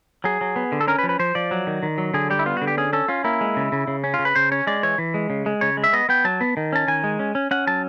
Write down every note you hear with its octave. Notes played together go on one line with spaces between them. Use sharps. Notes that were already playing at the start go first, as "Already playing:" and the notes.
F#3 G#4
F#3
B3
D3
A4
C#4 A#4
B4
F3
B4
F3 C5
F3 D5
F#3
D#3
D#3
F#3
D3 G#4
G3 G4
E4
B3 F4
F#4
D3
G4
C#4 G#4
C#4 A4
C#4 F4
A#3 E4
G#3
C#3
C#3
C#3
C#4
F4
C#3
B4
C#3 C5
C#4 C#5
G#3 D5
E3 C#5
E3
G#3
C#3
G#3
C#3 C#5
G#3
E5
B3 D#5
B3 G5
F#3 A5
B3
D#3
C#4 A5
D#3 G#5
G#3
C#4
C#4
C#4 F#5
F#3 A5